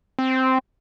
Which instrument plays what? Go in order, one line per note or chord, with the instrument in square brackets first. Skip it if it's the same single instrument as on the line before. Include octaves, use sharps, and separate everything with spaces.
[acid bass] C4